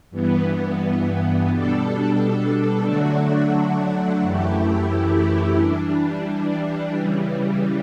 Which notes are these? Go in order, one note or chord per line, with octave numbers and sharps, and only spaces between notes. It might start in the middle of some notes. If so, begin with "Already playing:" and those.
G2 E3 B3
B2 G3 D4 A4
D3 F#3 A3 D4 F#4
F#2 E3 A3 E4 G4
E3 G3 D4
C#3 E3 G3